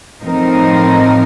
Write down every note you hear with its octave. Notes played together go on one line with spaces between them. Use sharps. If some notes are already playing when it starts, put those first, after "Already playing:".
A2 F3 C4 D#4 A#4